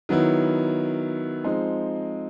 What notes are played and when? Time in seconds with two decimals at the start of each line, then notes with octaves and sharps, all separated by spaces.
0.09 D#3 F#3 B3 E4
1.44 F3 G#3 C4 D#4